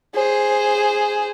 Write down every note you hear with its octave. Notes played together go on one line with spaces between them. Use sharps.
G#4 C5